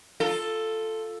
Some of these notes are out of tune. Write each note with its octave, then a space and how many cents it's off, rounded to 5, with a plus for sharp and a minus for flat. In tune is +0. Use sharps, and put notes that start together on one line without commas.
F4 +0 A4 +5